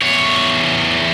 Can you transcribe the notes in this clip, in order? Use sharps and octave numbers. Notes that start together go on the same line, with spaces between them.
E2 C#5